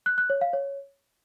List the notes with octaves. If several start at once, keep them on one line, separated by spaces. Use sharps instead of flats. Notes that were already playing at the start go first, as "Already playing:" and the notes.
F#6
F#6
C#5
F5
C#5